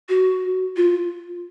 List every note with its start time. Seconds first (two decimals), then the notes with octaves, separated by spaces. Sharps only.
0.09 F#4
0.77 F4